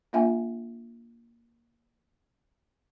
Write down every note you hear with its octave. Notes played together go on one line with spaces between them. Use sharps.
A#3 D4 F4 E5 G5 G#5